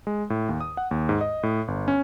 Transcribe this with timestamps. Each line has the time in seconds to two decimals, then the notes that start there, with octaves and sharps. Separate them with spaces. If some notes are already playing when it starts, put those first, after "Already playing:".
0.07 G#3
0.30 A2
0.49 D#2
0.61 D#6
0.77 F#5
0.91 D#2
1.09 G#2
1.21 D#5
1.43 A2
1.68 G1
1.88 C#4